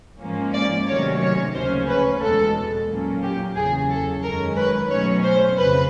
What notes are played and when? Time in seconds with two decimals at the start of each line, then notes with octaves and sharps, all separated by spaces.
0.20 G#2 F3 A#3 C#4
0.54 D5
0.87 C3 D#3 F#3 A3 C#4 C#5
1.21 C#5
1.55 D2 C#3 F3 A#3 C#4 C5
1.88 B4
2.22 E2 B2 G#3 A4
2.89 A#2 F#3 A#3 C#4
3.22 G4
3.56 E2 C#3 F#3 G#4
3.89 A4
4.23 F#2 D#3 G#3 C#4 A#4
4.56 B4
4.90 B2 F#3 A3 C#4 C#5
5.23 C5
5.57 F2 C#3 B4